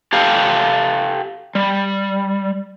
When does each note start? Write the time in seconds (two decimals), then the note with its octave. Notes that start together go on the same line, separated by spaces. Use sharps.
0.13 G4 A4 F5
1.55 G3